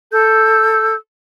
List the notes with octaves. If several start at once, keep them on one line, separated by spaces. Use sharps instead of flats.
A4 E6 G6